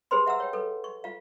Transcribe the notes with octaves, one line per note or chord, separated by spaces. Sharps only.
G4 G#4 B4 C5 B5 C6
E5 F#5 A#5 E6
C#5 G5
A4 B4
C#6
F4 F5